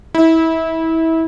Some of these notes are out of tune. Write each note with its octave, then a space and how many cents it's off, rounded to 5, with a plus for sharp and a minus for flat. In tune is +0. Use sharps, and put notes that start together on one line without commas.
E4 -25